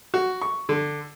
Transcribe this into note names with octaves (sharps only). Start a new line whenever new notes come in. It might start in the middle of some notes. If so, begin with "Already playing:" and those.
F#4
C#6
D3